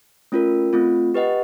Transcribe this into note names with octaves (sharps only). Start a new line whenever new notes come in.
A3 C#4 F4 A#4
A3 C4 F4
G4 B4 D#5 F#5